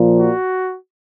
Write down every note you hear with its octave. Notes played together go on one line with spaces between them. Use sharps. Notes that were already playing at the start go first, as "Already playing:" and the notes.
Already playing: A#2 F3
F#4